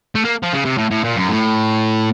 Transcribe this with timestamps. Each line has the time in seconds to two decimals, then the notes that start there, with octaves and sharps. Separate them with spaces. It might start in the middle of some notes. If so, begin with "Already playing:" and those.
0.15 A3
0.25 A#3
0.43 F3
0.53 C#3
0.65 C3
0.78 A2
0.91 A2
1.04 A#2
1.17 F#2
1.29 A2